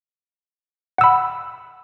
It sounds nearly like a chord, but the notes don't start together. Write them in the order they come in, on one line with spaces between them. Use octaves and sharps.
F#5 E6 B5